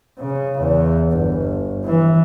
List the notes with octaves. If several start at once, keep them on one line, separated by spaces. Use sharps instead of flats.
C#3
E2
G1
E3